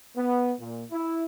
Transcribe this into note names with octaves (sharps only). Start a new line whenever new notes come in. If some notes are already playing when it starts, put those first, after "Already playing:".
B3
A#2
E4